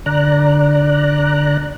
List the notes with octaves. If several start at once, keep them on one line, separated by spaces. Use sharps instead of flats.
D3 D5 A#5 F#6